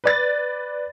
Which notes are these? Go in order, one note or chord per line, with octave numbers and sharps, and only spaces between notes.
B4 D5 A6